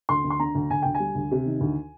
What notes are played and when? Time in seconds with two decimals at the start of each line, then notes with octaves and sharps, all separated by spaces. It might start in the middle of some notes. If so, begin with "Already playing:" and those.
0.09 D2 C6
0.24 D2
0.30 C6
0.40 D3 A#5
0.55 D2
0.70 D2 G#5
0.82 D2 G5
0.95 G#5
1.00 G3
1.15 D2
1.31 C3
1.46 D#3
1.61 D2